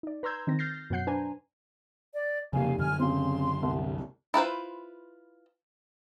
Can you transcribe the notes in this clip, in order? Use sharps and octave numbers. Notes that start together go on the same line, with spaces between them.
D#4 D5
B4 A#5 C6 E6 G6 G#6
D#3 C4 A#6
F6 G6 A6 A#6 C7
F#2 B2 F#3 F#5 G6 C7
D4 B4 C5 G#5 A#5
D5
F1 C#3 A#3 G4 F5 G#5
F#2 D3 G#5 F6
C#3 C4 C6
C2
E4 F4 B4 C5